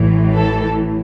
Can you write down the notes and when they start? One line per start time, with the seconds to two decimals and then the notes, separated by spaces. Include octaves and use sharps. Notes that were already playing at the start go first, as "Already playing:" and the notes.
Already playing: A1 A2 E3
0.34 A4